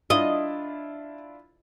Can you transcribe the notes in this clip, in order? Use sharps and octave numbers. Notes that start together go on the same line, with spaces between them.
D4 E4 F4 D#5